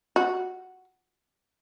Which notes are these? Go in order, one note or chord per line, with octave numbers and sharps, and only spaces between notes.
F#4